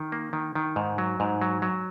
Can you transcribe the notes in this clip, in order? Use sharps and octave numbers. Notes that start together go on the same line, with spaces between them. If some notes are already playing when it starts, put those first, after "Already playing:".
Already playing: D#3
A#3
D#3
D#3
G#2
F#3
G#2
F#3
F#3